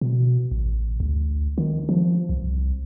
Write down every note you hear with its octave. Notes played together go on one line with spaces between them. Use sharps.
B2
A1
D2
D#3
F3
C2